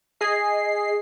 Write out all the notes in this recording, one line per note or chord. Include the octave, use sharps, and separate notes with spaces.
G#4 D#5 C7